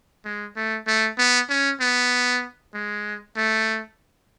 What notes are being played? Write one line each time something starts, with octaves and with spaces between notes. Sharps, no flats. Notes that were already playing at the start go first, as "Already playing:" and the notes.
G#3
A3
A3
B3
C#4
B3
G#3
A3